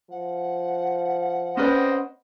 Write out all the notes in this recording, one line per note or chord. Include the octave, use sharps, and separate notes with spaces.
F3 F#5
C4 C#4 B4 C5 D5 D#5